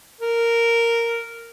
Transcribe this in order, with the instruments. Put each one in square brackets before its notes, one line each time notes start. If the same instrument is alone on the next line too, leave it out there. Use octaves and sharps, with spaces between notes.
[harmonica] A#4